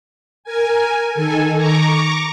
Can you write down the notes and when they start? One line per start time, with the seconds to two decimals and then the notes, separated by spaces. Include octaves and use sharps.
0.44 A#4 G#5
1.12 D#3 A4 G#5
1.56 A#5 C#6 D6